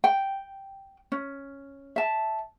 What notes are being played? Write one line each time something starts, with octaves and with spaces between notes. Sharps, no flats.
G5
C#4
E5 A5